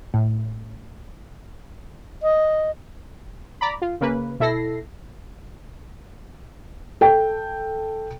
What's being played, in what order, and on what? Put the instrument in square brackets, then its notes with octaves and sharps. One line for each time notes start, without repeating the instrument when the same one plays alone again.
[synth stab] A2
[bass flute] D#5
[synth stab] D5 A#5 B5
F4
C#3 A#3 B4
B2 E4 A4 A#6 C7
[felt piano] A4 G5